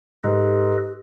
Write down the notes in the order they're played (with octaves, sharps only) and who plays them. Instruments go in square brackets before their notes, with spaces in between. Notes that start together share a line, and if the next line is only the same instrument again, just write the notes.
[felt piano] G#2 [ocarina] G4 [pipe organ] A4 B4 D#5